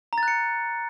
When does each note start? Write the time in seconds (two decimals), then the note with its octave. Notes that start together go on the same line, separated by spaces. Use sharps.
0.13 A#5
0.18 A6
0.23 F#6
0.28 C#7